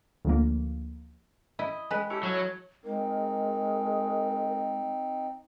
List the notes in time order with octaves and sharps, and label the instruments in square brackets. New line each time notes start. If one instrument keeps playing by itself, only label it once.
[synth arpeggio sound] D2 F3 A#3
[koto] E4 [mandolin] D#5
[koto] G#3 B4
[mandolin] C#4 E4 A4 [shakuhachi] G4
[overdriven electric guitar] F#3 [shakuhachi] C#5
[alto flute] G#3 [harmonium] C4 D#4 [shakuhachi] A#4